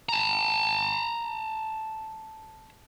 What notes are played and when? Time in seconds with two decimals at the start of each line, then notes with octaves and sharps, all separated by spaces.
0.09 A5 A#5